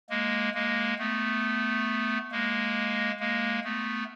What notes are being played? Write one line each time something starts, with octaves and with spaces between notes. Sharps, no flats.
G#3 A#3
G#3 A#3
A3 B3
G#3 A#3
G#3 A#3
A3 B3